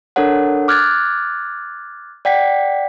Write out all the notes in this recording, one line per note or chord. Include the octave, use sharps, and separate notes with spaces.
D4 A4 A#4 C#5 F#5
D6 F6 F#6 G#6 A6
D5 F#5 G5 B6